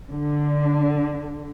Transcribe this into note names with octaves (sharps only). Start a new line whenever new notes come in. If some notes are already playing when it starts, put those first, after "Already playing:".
D3